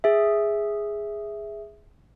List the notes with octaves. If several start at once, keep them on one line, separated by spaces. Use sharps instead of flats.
G#4 E5